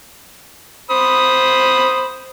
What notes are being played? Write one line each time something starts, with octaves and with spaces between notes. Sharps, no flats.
C5 B5 D#6